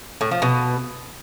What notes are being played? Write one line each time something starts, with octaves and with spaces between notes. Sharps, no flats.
A2
F3
B2